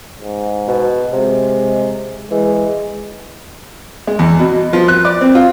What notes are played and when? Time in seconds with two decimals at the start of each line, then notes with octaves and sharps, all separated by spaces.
0.21 G#2
0.68 B2
1.13 C3 G#3
2.31 E3 G#3
4.07 G#3
4.19 E2
4.39 B2
4.73 F3
4.88 F#6
5.05 D5
5.21 C4
5.35 F4